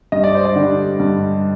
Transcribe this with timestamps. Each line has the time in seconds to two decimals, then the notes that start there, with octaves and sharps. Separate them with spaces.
0.12 G2 D#5
0.24 D5
0.35 C5
0.45 D5
0.55 D3 G3
1.00 G2